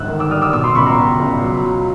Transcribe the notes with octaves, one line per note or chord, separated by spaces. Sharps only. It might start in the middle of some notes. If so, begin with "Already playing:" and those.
Already playing: G1 G#2 G3 E6 F#6
D#3
D6 E6
G3 D#6 F6
D6 E6
B2 D6 E6
C6 D6
C#2 B5 C#6
A#5 C6
B2
C#2
F#3
F#3